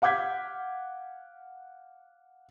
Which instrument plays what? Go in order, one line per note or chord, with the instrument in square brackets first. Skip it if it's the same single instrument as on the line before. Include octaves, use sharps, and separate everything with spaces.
[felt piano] F5 F#5 D6 G6 G#6 B6